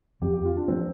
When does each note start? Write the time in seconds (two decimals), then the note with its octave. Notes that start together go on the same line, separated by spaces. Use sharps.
0.21 F2 F3 C4 G4
0.34 G4
0.45 F4
0.57 D4
0.68 F3 A#3 C4